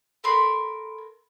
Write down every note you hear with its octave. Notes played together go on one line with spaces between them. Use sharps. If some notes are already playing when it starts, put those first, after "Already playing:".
A4 A#4 B5 C6